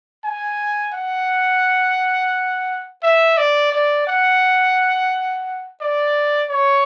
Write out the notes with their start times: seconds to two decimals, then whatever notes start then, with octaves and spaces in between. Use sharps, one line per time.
0.24 G#5
0.94 F#5
3.03 E5
3.37 D5
3.72 D5
4.07 F#5
5.81 D5
6.50 C#5